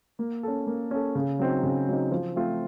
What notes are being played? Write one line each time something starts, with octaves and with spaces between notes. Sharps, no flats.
A#3
C#4 A4
A#3
C#4 A4
C#3
F#3 C4 D#4
C#3
F#3 C4 D#4
F3
A3 C4 F4